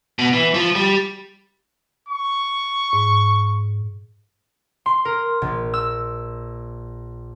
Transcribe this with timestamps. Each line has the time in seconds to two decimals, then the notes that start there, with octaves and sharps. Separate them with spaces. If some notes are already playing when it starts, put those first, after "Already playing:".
0.19 B2
0.33 E3
0.54 F3
0.75 G3
2.09 C#6
2.93 G#2
4.86 C6
5.05 A#4
5.42 A#1
5.74 E6